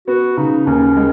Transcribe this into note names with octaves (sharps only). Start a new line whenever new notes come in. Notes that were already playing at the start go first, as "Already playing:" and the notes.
B3 F#4
C#3 D#4
D#2 C#4
G#3